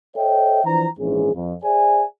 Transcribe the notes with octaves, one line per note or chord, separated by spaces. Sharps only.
A4 C5 C#5 D#5 E5 G5
E3 F3 D4 C5 A#5
A#1 G#2 E3 C#4 G#4
F2
G#4 C5 D5 E5 G#5